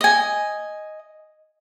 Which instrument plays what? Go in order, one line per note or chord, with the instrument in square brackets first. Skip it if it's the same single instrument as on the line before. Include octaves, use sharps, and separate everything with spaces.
[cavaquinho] D#5 G#5